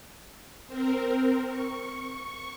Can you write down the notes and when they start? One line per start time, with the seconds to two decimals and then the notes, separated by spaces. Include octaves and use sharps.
0.67 C4 A#4
1.48 C#6